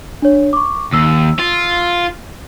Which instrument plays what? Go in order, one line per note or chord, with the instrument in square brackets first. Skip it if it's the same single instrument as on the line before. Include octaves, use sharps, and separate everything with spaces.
[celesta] D4 C#5
C#6 D6
[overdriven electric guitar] D#2 [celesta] E6
[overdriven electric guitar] F4